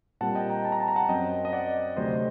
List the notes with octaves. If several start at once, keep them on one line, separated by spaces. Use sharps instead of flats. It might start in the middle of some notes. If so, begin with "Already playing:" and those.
A#2 G3 C4 F#5 A5
D#5 G5
G5 A#5
A5
A#5
A5
A#5
F#5 A5
F#2 F#3 C4 D#5 G5
D#5
D5 F#5
D2 C3 F#3 A3 C5 D#5